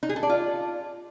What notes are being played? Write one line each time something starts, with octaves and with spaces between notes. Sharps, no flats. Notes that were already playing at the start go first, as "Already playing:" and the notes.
D#4
G#4
A4
D5
F4